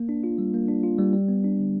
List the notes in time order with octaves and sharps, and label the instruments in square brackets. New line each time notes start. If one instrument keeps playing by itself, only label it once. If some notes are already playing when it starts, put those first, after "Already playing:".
Already playing: [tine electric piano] A#3
D4
F4
G3
A#3
D4
F4
G3
G3
B3
D4
D3